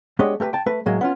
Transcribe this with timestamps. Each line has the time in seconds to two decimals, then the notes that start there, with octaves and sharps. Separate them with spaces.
0.19 G#3 B3 D4 G4 C#5 D#5
0.40 A3 G4 A#4 B4
0.53 G5 A5
0.66 A3 B4
0.86 A2 F#3 G#3 A#3
1.01 B3 C#4 F4